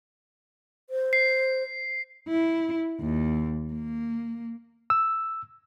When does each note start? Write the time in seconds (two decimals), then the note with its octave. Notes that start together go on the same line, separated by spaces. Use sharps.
0.90 C5
1.13 C7
2.28 E4
3.01 D#2
3.73 A#3
4.90 E6